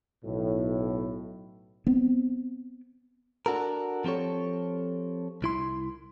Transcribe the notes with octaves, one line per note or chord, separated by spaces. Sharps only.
B1 A2
B3 C4
D4 F#4 A4 A#4
F3 C4 G4 A4 C#5
C2 E4 C6